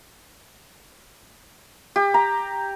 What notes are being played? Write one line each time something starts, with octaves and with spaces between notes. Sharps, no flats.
G4
A#5